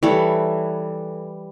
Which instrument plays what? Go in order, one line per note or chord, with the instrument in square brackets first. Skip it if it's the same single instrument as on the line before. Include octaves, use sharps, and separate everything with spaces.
[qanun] E3 G3 A4 C#5